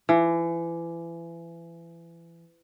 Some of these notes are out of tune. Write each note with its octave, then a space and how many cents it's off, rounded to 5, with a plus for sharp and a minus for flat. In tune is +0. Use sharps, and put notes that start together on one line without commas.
E3 +30